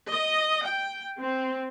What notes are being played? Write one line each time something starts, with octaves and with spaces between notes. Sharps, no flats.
D#5
G5
C4